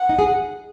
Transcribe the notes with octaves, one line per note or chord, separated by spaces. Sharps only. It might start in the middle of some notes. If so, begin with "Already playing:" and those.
Already playing: F#5
D#4
G#4